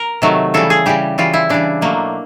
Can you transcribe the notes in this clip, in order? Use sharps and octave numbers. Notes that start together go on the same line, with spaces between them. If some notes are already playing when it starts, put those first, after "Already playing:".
Already playing: A#4
C3 D#3 F#3 A3
C#3 E3 G3 A4
G#4
C#3 E3 G3 G4
C#3 E3 G3 F4
E4
C#3 E3 G3 D4
B2 F#3 A3 A#3